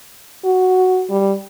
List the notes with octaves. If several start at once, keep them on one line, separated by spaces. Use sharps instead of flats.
F#4
G3